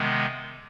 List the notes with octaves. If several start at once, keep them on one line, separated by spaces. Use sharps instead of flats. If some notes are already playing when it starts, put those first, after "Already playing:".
Already playing: C3 D#3 G#3 B3